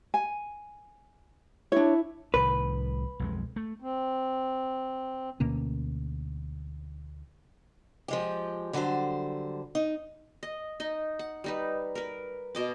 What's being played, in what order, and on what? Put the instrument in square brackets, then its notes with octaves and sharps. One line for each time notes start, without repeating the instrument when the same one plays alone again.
[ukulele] G#5
[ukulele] D4 C#5 [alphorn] E4
[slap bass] C2 A2 D#3 [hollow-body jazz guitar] B4
[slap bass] B1 F2 G#3
A3
[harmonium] C4
[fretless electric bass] D2 B2 A#3 C#4
[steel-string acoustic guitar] F3 G#3 G4
D3 F#3 G3 A4 C5
D#4
[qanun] D#5
D#4 D#5
F#5
G3 D#4 B4
A#4 B4
B2 D#5 D6